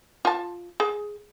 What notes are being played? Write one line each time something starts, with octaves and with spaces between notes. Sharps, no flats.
F4 A5
G#4